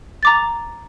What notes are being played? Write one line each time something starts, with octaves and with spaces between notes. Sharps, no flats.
A#5 D6 A6